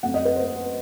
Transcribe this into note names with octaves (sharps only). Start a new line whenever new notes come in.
F#2 F#3 A3 C4 F#5
D#5
B4
C5